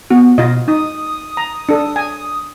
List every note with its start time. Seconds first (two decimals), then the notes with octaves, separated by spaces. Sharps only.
0.11 B3 F#4
0.38 B2 F4 D#5
0.68 D#4 D#6
1.37 A#5
1.69 D4 A4
1.96 G#5